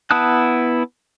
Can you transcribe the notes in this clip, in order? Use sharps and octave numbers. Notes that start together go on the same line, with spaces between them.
B3 E4 A5 D#6 F#6